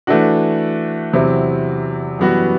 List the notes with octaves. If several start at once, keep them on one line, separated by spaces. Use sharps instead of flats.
E3 A3 D4 F#4
E2 C3 F#3 C4 E4
F#2 E3 G3 B3 F#4